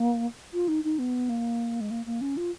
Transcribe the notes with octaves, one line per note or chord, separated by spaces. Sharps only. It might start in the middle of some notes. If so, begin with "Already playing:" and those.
Already playing: A#3
F4
D#4
D#4
B3
A#3
G#3
A#3
A#3
C#4
F4